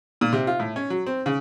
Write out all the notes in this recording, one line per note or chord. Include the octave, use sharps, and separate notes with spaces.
A#2
C3
F4
A2
C#4
F#3
C4
C#3